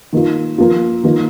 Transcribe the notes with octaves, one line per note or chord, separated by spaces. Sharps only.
D#3 A#3 F4
F3 A#3 F4
D#3 A#3 F4